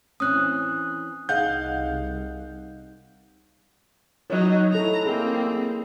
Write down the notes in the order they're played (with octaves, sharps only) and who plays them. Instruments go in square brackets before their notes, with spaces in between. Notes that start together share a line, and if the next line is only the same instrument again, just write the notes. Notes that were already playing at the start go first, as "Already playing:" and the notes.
[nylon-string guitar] E3 C4 C#4 [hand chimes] D#6 F#6
[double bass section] C2 [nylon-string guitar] D#4 G#4 D#5 [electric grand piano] F5 F#5 G6
[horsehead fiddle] F#3 D#4 [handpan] C#5 D#5
[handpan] E4 A4 [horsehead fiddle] A#5
[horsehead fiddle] A#3 C4 [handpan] G#4